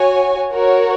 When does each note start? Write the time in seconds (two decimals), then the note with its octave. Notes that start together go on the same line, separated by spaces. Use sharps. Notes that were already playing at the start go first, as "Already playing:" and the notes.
Already playing: F#4 C#5 G#5
0.53 F#4 A#4 C#5